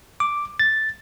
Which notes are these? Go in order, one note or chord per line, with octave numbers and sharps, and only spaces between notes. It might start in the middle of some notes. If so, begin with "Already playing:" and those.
D6
A6